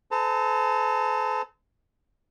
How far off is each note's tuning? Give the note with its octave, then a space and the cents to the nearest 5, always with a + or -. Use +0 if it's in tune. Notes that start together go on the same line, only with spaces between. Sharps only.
A4 -40 C5 -45 A5 +45